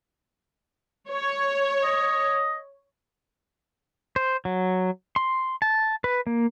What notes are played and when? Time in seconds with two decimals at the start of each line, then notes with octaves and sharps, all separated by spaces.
1.09 C#5
1.83 D#5
4.16 C5
4.45 F#3
5.16 C6
5.62 A5
6.04 B4
6.27 A#3